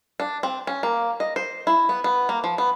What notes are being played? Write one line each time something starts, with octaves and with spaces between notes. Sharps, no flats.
D4
C4
C#4
A#3
D#5
C5
E4
B3
B3
A#3
F3
B3